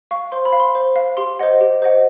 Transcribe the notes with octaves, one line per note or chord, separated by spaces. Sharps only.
F5 C#6
C5 C6
B5
F5
C6
C5
F5
G4 C6
C5 D#5 F#5
G4
C5 D#5 F#5